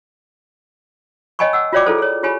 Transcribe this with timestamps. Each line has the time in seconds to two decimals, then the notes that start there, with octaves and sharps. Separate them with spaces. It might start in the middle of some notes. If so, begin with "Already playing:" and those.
1.39 C#5 D#5 G5 G#5 B5 C#6
1.53 F#5 E6
1.73 F4 F#4 C#5 D5 G5 D6
1.86 E4 F4 G#4 A4 C5
1.98 G#4 C#5
2.23 F4 G4 C#5 G#5 B5